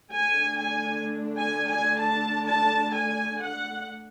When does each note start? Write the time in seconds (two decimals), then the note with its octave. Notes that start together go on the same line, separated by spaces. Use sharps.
0.12 D3 A3 D4 G#5
0.58 G#5
1.37 G#5
1.69 G#5
2.00 A5
2.47 A5
2.93 G#5
3.41 F#5